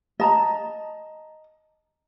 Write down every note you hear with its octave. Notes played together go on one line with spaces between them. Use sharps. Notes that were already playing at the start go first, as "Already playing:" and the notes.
D#5 A5 A#5